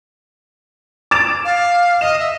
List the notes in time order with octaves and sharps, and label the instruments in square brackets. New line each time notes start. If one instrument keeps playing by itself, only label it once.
[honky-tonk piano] D6 A6 E7
[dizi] F5
[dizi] D#5 [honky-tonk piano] E7
[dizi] E5